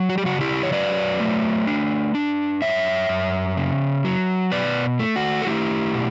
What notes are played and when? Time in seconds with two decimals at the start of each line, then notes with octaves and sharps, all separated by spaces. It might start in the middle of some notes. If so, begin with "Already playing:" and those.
Already playing: F#3
0.09 F#4
0.18 G4
0.25 C#3 F#4
0.41 E4 G4
0.63 C#5
0.72 F#3 B4 D5
1.20 A3
1.67 D4
2.15 D4
2.62 F#2 C#5 E5
3.09 F#2
3.57 C#3
4.05 F#3
4.52 B2 B4 D5
4.99 A3
5.16 F#4
5.42 A4
5.47 A3 E4 G4
5.94 B2